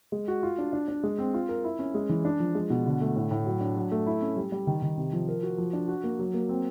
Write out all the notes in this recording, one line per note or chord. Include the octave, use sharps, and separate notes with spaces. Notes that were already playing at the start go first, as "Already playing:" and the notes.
G#3
F#4
F4
D4
D4
D4
G#3
C4
F4
A#4
E4
C#4
G#3
E3
D4
F3
G#3
B2
D3
A3
A2
A2
F#3
D4
F#3
A3
E4
C#4
G3
G3
D#3
D#3
C3
F3
A#4
F#4
F3
D4
F#4
A#3
F#3
A#3
C4